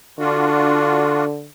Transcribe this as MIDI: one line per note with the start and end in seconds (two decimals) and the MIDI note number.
0.19 1.48 50
0.19 1.25 62
0.19 1.25 65
0.19 1.25 66